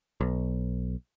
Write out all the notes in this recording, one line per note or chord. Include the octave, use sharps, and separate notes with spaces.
B1